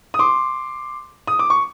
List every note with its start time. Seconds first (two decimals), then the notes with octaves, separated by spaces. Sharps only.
0.14 D#6
0.19 C6 D6
1.27 D#6
1.39 D6
1.50 C#6